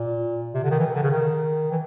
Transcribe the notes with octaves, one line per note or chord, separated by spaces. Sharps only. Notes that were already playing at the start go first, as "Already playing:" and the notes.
Already playing: A#2
C3
D3
D#3
E3
D#3
D3
C#3
D#3
E3